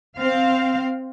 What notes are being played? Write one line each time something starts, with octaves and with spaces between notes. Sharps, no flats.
C4 F5